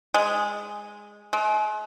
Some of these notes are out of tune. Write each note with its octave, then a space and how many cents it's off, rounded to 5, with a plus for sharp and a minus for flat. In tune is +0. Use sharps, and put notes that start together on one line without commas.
G#3 -5
G#3 +40